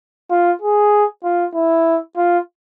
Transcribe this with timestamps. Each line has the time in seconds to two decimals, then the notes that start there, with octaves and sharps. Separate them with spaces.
0.31 F4
0.62 G#4
1.24 F4
1.55 E4
2.17 F4